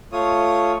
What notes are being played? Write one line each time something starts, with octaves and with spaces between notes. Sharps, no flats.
A3 F4 C#5 D#6